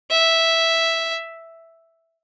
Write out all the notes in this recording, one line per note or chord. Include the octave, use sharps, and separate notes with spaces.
E5